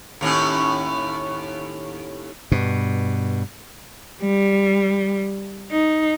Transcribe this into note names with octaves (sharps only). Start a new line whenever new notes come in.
D#2 A2 C#4
G2 B2
G3
D#4